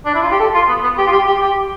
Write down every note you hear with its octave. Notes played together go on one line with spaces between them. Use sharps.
D4
E4
F4
G4
A4
F4
B3
B3
G4
F4
G4
G4
G4